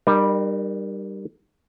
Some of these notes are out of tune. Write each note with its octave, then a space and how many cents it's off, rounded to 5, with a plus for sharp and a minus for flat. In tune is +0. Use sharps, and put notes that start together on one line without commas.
G3 +0 D#4 -45 A#4 +0